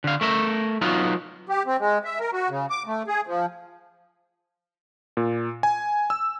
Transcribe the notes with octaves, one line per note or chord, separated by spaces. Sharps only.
D3 F5
A3 A#4 E5
F#3 B3 D#4 F4
G4
C4
G#3
E5
A#4
F#4
C#3
D6
A3
G#4
F3
A#2
G#5
E6